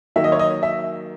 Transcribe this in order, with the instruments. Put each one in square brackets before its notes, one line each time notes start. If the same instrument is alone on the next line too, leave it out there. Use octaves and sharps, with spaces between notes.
[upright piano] D#3 F#3 A#3 E5
D#5
C#5
D#5
E5